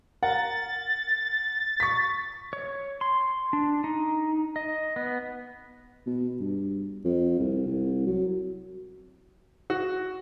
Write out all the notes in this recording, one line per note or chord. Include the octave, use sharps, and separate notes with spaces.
A#4 F#5 A6
C#6 B6
C#5
C6
D4
D#4
D#5
B3
B2
G2
F2
C2
C2
F#3
F#4